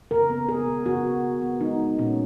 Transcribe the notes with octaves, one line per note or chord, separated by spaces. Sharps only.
C#3 A#4
B3
C#3 G#4
C#3
B3 F#4
C#3
C#3
B3
G#3 D#4
G#3
A#2 C#4